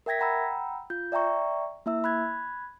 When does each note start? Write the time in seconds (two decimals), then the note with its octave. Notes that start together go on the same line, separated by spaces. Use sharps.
0.06 A#4 E5 G5 G#6 A#6 B6
0.19 F#5 G5 A#5 B5 E6
0.90 F4 G6
1.12 D5 E5 G5 A#5 C#6
1.86 A#3 E4 E5 E6
2.04 B5 F#6 G#6